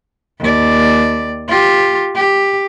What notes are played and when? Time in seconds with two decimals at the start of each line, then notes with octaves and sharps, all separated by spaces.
0.40 D#2 D5
1.48 F4 G4
2.15 G4